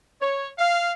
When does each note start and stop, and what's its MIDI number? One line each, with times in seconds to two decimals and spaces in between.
0.20 0.49 73
0.59 0.93 77